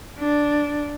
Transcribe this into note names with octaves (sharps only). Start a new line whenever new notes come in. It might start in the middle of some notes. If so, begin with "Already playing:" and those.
D4